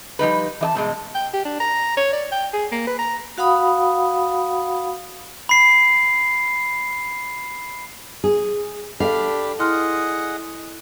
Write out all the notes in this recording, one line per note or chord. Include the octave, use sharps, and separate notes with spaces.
F3 G3 D#4 B4
E3 D#5 A5
G2 B2 G#3
G5
G4
D4
A#5
C#5
D5
G5
G#4
A#3
B4
A#5
F#4 F5 F#5 B5 D#6
B5 C7
G#4
D4 G4 A4 D5 F5 B5
E4 G#4 D#5 F#5 C6 F6